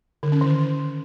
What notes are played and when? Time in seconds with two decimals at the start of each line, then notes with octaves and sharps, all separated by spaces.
0.23 D3
0.32 C#4
0.41 D#3